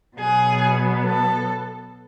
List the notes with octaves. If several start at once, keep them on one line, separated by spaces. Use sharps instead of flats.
B2 F#3 B3 G#4
A4